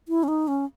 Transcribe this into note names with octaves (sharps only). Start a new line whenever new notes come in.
E4
C#4
D#4
C#4